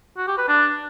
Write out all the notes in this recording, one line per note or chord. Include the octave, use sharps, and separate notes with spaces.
F#4
G4
B4
D4